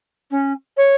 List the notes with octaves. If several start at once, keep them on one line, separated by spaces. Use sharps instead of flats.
C#4
C#5